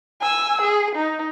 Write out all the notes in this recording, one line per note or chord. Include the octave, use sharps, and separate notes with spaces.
G#5 E6
G#4
D#4